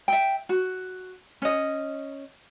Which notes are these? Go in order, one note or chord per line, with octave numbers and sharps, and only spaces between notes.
E5 G5
F#4
C#4 D#5